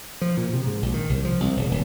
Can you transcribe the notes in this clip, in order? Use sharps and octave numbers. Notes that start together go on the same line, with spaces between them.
F3
A#2
C3
G#2
A#1
D#3
C2
F3
C2
E1
D1